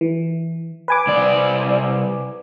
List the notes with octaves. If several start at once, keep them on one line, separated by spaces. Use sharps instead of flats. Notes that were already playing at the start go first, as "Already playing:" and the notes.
E3
B4 G#5 D6
C2 D5